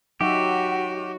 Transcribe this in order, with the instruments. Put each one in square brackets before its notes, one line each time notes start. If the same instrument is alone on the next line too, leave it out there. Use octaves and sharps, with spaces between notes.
[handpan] F#3 D#4 E5 [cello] F#4 [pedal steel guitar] G4 [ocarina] F#5